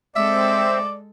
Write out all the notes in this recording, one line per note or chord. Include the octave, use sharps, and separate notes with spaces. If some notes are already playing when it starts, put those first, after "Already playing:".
G#3 C4 A4 D5 E5